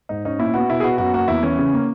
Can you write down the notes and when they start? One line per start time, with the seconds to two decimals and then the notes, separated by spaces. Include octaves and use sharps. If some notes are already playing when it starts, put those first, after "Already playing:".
0.09 G#2 D#4
0.25 C#4 D#4
0.39 A#2 E4
0.54 B3 F#4
0.70 B2 E4
0.80 G#4
0.84 B3 F#4
0.98 F#2 F#4
1.14 A#3 F#4
1.28 E2 E4
1.43 E3 C#4
1.59 C#3
1.73 A#3